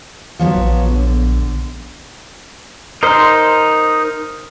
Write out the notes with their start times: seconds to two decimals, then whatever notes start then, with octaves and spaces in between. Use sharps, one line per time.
0.39 F3 F#3 B3
0.55 A#1
0.90 D3
3.03 D#4 A#4 C5 C6